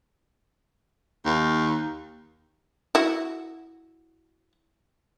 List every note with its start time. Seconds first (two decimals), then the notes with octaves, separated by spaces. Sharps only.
1.25 D#2
2.95 E4 F#4